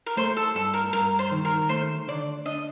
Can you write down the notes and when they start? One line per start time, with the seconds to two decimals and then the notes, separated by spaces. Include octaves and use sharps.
0.07 A#4
0.17 A3 C5
0.37 A4
0.55 G2 A4
0.74 A#4
0.93 G2 A#4
1.19 C5
1.31 D#3
1.45 A#4
1.69 A3 C5
2.08 D3 D5
2.46 D4 D#5